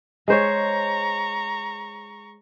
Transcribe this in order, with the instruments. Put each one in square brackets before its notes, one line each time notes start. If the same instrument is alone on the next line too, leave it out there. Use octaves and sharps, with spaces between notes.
[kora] G#3 C5 C#5 [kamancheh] A#5 C#6